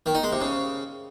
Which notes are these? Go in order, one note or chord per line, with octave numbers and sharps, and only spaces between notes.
D#3
D#4
G#3
C3
C#3